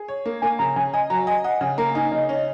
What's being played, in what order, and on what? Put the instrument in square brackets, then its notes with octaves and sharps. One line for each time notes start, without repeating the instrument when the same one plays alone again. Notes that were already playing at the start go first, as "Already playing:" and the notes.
Already playing: [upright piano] G#4
C#5
A#3
[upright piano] A#3 [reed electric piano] G#5
[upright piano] C#3 [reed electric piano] A#5
[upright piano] C#3 [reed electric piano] G#5
[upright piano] D#5 [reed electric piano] G#5
[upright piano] F#3 [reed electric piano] A#5
[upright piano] D#5 [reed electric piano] G#5
[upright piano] D#5 [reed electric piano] F#5
[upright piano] C#3 [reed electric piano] G#5
[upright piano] A#3 [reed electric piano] A#5
[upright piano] D#4 [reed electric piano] G#5
[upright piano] C#3 [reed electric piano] D#5
[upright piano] C#4